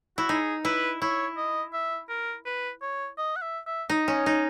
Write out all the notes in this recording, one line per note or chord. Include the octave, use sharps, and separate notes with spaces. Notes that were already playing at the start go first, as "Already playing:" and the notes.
E4 F#4
D#4 G#4
E4 B4
E4 C#5
D#5
E5
A#4
B4
C#5
D#5
F#5
E5
E5
D#4 D#5
C#4
D#4